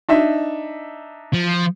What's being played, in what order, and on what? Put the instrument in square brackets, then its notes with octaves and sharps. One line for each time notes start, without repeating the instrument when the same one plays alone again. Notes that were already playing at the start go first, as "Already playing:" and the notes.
[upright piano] D4 D#4 E5
[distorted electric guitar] F3